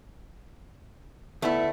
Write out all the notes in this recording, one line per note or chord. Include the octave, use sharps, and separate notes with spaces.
D2 A3 B3 E4